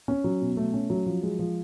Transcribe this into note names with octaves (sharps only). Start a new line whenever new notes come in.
C#4
F#3
B2
A3
C#4
F#3
F3
G#3
F3